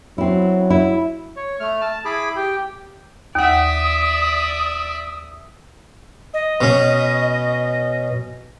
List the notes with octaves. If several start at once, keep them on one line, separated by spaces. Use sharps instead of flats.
F#3 C4 E4
E4
C#5
A3 F6
A5
E4 G#4 B5 D6
G4 G5
D#2 D5 E5 F#5 D#6
D#5
B2 C#4